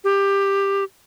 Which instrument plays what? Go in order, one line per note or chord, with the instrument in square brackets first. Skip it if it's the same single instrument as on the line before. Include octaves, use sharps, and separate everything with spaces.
[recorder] G4